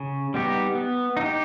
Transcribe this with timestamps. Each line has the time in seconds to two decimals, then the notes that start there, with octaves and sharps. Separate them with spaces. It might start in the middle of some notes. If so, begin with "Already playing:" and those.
Already playing: C#3
0.34 G3 B3 D#4 G4
0.75 B3
1.17 D#4 G4